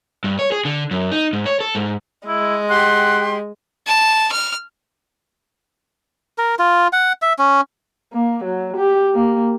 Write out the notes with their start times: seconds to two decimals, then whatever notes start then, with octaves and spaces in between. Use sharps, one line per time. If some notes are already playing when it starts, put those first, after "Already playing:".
0.24 G2
0.39 C#5
0.52 G#4
0.65 D3
0.91 F#2
1.12 D#4
1.33 G#2
1.46 C#5
1.61 A4
1.75 G#2
2.28 G#3 E4
2.70 G4 F#5 G5 C6
3.87 A5
4.32 F6
6.38 A#4
6.59 F4
6.93 F#5
7.22 E5
7.39 C#4
8.13 A#3
8.44 F#3
8.77 G4
9.14 A#3